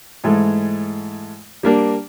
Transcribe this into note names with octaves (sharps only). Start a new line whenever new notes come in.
G#2 E3 G#3 A3
G3 A#3 D4